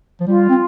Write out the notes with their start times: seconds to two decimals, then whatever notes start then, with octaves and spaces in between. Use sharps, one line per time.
0.20 F3
0.27 G3 F4
0.49 C4